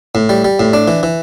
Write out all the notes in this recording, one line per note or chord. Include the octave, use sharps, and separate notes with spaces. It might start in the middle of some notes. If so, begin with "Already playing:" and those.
A2
G3
G3
A2
D4
E3
E3